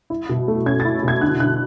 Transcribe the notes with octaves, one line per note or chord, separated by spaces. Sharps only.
E4
B2
A3
C#4 G#6
A6
E4
B2 G#6
D3 F#6
D3 F#6